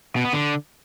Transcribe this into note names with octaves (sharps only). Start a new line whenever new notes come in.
B2
B3
D3